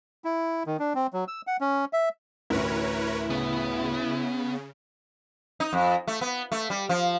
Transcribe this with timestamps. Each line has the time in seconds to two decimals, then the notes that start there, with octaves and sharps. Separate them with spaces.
0.24 E4
0.67 D#3
0.79 D4
0.95 C4
1.13 F#3
1.28 E6
1.47 F#5
1.61 C#4
1.93 E5
2.50 A1 D2 E4 A#4 B4 C#5
3.30 C#3 B3
5.60 D#4
5.73 F2
6.07 A3
6.21 B3
6.52 A3
6.70 G3
6.89 F3